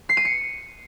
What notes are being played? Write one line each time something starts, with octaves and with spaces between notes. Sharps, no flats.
C7
D#7
C#7